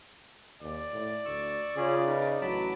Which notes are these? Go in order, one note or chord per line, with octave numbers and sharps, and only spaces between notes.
D#2 D5
A2
D2 C#6 E6
C#3 C#4 F4 G#4
D#4 A#4 B4
A1 F#3 A5 B5 D6